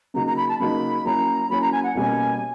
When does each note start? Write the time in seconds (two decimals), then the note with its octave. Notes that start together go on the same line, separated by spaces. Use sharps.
0.14 C#3 F#3 A#3 D#4 F#4 A#5
0.26 A#5
0.36 B5
0.49 A5
0.59 C#3 F#3 A#3 D#4 F#4 B5
1.05 F#3 A#3 C#4 E4 A#5
1.49 F#3 A#3 C#4 E4 B5
1.61 A#5
1.72 G#5
1.83 F#5
1.95 B2 G3 A#3 C#4 G#5